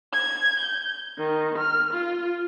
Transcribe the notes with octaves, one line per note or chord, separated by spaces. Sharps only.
G#6
G6
D#3
F6
F4